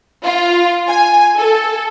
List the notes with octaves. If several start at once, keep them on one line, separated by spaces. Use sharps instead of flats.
F4
G#5
A4